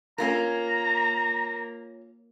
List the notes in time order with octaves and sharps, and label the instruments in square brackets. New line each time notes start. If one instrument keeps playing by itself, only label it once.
[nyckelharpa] A#3 [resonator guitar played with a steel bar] C#4 F4 A#4 [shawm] A#5